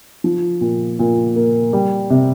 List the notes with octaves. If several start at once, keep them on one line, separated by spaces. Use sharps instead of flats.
F3
A#2
A#2
A#3
G3
C3